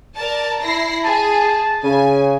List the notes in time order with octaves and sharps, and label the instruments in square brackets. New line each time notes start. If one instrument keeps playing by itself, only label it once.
[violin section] A#4 D5 A5
E4 A#6 C7
[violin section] G#4 [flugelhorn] A5
[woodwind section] C#3 [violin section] G#5